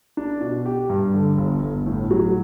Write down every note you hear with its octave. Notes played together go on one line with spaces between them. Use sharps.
D4
B2
G4
G2
D3
G1
G1
A2
F#3